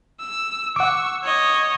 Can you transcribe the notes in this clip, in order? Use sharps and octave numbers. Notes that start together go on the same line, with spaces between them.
E6
F#5 C#6 D6 E6
C#5 D#5